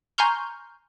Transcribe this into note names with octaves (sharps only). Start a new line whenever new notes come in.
G#5 A#5 C6 C#6 F6 G6